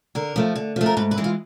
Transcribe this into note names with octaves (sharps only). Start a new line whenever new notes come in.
D3 A#4
F3 A3
D3
F3 A3
A#4
G#2 B4
B4
E3 G#3
F4